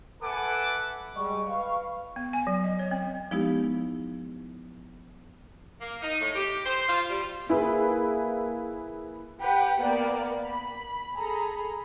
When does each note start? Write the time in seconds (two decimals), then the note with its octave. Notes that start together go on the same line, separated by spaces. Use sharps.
0.22 A4 B4 E5 F#5 G#5 D6
1.16 G3 G#3 D#5 C#6
1.47 B4 F5
2.16 B3
2.33 G#5
2.47 F#3
2.64 D#5
2.79 C#5
2.91 C4
3.31 F3 G#3 B3 D#4 E4 G4
5.80 A#3
6.01 D#4
6.20 A2
6.34 G4
6.65 C5
6.88 F4
7.08 G3
7.49 A#3 E4 G#4 B4
9.41 G4 B4 F#5 G5
9.81 A#3 B3 D5
10.46 B5
11.16 G#4 A4 A#5 B5